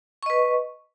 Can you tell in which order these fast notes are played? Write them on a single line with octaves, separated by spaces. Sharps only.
C#6 D#5 B4